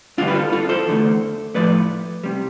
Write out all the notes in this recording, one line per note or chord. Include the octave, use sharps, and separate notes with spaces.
G2 D3 G3 D4 F4
B4
F4 A4
F4 A4
A4 C5
E2 D3 A3
A2 F3 A3 B4 D5
C3 G3